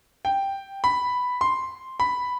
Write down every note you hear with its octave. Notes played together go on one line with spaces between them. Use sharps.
G5
B5
C6
B5